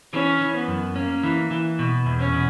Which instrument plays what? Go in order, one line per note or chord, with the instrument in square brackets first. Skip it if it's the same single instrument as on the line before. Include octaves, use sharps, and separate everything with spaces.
[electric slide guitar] E3 [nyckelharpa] C#4
[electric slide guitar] E3
[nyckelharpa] B3
[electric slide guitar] F#2
[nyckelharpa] A#3 [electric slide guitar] C#4
[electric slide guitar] E3
E3
B2
E2
[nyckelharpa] C#4
[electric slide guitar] B2